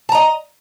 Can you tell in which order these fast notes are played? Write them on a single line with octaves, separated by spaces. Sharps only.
A5 A#5 D#5